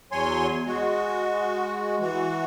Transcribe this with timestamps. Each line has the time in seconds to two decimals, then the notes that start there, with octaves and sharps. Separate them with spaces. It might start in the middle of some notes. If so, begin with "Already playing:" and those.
0.12 E2 F#3 C#5 G#5 C6
0.67 G#3 F#4
2.01 E3 F#4